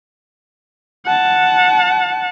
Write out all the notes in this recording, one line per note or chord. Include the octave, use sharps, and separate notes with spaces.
F#5 A5